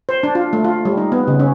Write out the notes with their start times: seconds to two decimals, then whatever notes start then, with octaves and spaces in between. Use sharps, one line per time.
0.09 C5
0.23 D4
0.35 F4
0.53 A3
0.64 F4
0.85 G3
0.97 D#4
1.12 B3
1.27 C#3
1.40 C#4